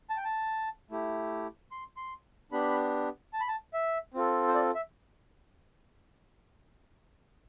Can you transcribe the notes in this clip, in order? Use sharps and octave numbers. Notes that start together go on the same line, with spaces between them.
A5
G5
A5
A3 E4 G4
C6
C6
B3 D4 G4 B5
A5
B5
A5
E5
C4 F4 A4
C5
D5
E5